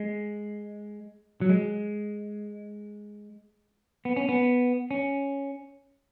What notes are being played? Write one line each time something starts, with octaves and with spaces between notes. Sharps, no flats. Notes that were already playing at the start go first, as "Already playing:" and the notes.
Already playing: G#3
F#3
G#3
B3
C#4
B3
C#4